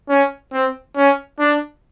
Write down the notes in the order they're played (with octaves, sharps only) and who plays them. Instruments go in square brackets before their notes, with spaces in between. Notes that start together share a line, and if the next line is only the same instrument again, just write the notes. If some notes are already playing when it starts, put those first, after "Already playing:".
[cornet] C#4
C4
C#4
D4